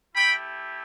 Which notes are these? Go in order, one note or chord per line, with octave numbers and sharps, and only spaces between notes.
A3 E4 G4 G5 B5